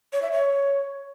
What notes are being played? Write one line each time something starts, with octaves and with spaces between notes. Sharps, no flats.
C#5
E5
C#5